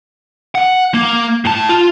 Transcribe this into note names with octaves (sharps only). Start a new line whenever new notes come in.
F#5
A#3
A2 A5
F4